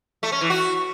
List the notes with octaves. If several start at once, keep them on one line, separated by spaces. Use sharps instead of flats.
A3
C#4
E3
F#4